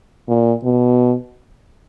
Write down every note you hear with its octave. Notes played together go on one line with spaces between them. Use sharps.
A#2
B2